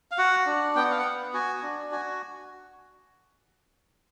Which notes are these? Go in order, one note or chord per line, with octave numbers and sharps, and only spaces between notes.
F5
F#4 F#5
D4
B3 G5
F#5
F5
F#5
B3
F#4 G#5
D4
F#4 G#5